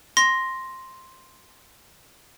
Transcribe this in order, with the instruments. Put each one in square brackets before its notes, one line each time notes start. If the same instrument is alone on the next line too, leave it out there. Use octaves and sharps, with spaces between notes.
[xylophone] C6 A#6